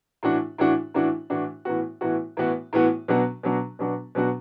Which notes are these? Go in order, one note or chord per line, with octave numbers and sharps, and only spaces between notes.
A2 E3 D4 F#4
A2 E3 D4 F#4
A2 E3 D4 F#4
A2 E3 D4 F#4
A2 E3 B3 F#4
A2 E3 B3 F#4
A2 E3 B3 F#4
A2 E3 B3 F#4
B2 F#3 B3 D4 F#4
B2 F#3 B3 D4 F#4
B2 F#3 B3 D4 F#4
B2 F#3 B3 D4 F#4